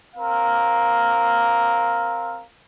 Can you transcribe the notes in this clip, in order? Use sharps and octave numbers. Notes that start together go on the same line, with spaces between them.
C4 A#4 F5